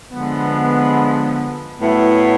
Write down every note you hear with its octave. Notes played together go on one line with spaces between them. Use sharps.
D3 F3 G#3 B3
A2 F#3 B3 E4